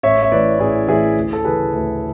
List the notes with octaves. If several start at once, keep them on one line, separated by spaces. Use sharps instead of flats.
A1 C#5 E5
E5
A2 E3 B4 D5
A1 E4 G#4
A2 E3 E4 G#4
D2
A4
C#3 E3 G#4 B4
D2